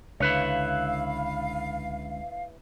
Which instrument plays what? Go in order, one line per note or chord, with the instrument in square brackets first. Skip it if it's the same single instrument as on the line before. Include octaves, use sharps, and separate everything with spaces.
[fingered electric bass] C#2 D3 [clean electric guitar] E4 B4 C#5 [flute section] F5